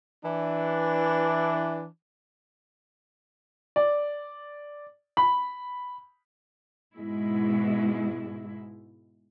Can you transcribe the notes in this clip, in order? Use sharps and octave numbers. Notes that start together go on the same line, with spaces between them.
E3 D4
D5
B5
G#2 B2 G#3 E4